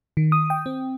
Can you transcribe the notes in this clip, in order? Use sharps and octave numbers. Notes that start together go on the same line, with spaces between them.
D#3
D#6
G5
C4